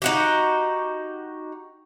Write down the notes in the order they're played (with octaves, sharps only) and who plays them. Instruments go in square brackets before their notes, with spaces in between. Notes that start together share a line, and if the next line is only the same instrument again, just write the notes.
[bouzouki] D#4 F#4 G4